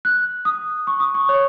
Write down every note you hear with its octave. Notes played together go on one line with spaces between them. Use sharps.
F#6
D#6
C#6
D#6
C#6
C#5